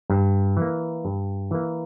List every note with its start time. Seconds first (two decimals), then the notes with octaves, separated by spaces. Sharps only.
0.10 G2
0.57 E3 A#3
1.05 G2
1.51 E3 A#3